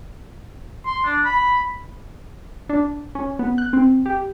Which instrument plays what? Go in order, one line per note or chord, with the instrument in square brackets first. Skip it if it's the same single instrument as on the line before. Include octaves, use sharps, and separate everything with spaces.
[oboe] C6
D4
B5
[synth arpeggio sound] D4
C#4
B3
F#6
C4
G4